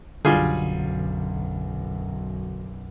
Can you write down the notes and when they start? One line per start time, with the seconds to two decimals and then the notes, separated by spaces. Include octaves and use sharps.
0.25 B1 F#2 D3 G3 F4 G#4